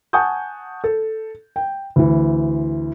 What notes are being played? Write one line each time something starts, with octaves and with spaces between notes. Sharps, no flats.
F#5 G#5 A5 C#6 D#6 G6
A4
G5
D2 E3